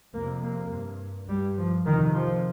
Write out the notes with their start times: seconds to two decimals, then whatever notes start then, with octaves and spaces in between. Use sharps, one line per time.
0.14 F2 C3 A#3
0.42 A#3
0.71 G2
1.28 G2 G3
1.57 F3
1.85 F2 C3 D#3
2.14 F3